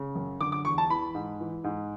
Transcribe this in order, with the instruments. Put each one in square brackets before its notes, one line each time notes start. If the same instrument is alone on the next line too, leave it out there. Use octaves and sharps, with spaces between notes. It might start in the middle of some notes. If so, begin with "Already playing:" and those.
Already playing: [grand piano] C#3
F#2
D3 D6
D6
E2 C#6
A5
E3 B5
G#2
E3
G#2